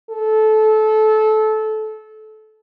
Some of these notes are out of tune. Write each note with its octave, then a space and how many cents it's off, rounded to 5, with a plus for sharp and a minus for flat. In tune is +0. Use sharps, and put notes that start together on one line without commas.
A4 -20